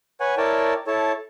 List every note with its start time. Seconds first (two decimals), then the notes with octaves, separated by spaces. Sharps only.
0.20 B4 C#5 F#5 G#5
0.37 E4 A#4 C#5 D5 G5 A5
0.87 E4 A4 C#5 A5